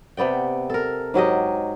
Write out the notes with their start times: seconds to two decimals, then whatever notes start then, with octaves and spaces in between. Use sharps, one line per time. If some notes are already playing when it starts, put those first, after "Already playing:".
0.17 C3 B3 D5 G5
0.70 A4 A#4
1.14 G#2 F#3 G4 D#5